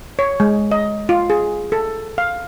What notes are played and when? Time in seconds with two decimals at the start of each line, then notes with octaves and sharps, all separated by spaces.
0.19 C#5
0.40 G#3
0.72 D#5
1.09 F4
1.30 G#4
1.72 A4
2.18 F5